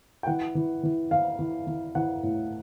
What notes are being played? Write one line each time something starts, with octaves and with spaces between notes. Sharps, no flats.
G5
E3 F#5
E3
E3
E3 F5
E3
E3
E3 F#5
A2